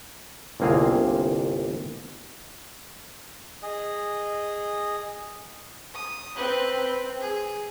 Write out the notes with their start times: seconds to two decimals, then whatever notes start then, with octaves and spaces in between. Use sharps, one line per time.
0.60 G1 C2 A#3 C4 G#4 F5
3.62 G#4 D#5
5.94 D#6
6.36 C4 B4
6.82 C4
7.21 G#4